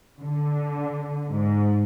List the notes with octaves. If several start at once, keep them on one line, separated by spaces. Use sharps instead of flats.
D3
G#2